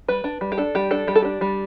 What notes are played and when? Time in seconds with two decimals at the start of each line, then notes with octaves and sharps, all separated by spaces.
0.08 G3 B4
0.24 D4
0.41 G3
0.52 G4
0.58 D4 A4
0.75 G3 G4
0.91 D4 A4
1.08 G3 G4
1.15 A4
1.22 D4 G4
1.41 G3